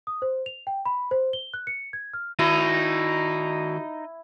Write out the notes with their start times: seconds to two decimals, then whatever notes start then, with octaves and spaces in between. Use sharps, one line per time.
0.07 D#6
0.22 C5
0.46 F7
0.67 G5
0.85 B5
1.11 C5
1.33 G7
1.54 F#6
1.67 C#7
1.93 G#6
2.14 F6
2.39 D#3 D#4 E4 F#4